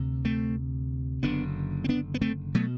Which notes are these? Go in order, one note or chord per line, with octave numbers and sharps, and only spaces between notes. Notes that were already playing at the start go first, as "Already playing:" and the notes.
Already playing: D2 C3
A3 C4
F#1 F#2 D3 B3 D4
C4
B3 D4
B3
A3 C4
B2 F#3 A3